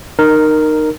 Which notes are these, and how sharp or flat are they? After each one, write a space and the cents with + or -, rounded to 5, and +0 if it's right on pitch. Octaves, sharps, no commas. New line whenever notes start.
D#4 -20 A#4 +0